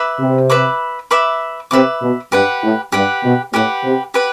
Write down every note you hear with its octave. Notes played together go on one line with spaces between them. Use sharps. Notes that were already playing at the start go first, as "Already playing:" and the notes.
Already playing: B4 E5 B5 D6
C3
B4 E5 B5 D6
B4 E5 B5 D6
C3 B4 E5 B5 D6
B2
G2 G4 B4 F#5
A2
G2 G4 B4 F#5
B2
A2 G4 B4 F#5
C3
G4 B4 F#5